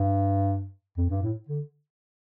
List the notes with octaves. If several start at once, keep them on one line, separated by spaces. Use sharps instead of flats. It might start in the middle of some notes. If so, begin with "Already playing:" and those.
Already playing: G2
F2
G2
A2
D3